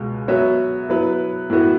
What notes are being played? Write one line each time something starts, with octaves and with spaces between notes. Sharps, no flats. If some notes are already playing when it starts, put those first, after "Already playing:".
Already playing: C#2 B2 G#3
F#3 B3 F#4 C#5 E5
F#3 B3 E4 B4
A2 E3 B3 F#4